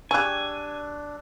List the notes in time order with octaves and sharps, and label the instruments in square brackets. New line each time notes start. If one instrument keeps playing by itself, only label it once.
[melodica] D4 [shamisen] G4 G#4 [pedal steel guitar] G#5 [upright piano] C#6 E6 F#6